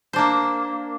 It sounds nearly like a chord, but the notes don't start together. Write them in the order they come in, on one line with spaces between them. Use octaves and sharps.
C5 D4 A#3